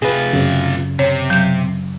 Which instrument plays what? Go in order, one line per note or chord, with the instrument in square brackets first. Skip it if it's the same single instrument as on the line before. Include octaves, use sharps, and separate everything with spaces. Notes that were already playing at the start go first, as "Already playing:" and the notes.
[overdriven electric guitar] C3 F4 [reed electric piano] G#4 B4
[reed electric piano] F#2 C#3
[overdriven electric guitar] C3 [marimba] C#5
[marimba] F#3 G6